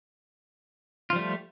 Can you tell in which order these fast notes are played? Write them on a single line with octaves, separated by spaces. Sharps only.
F4 F3 G3 A3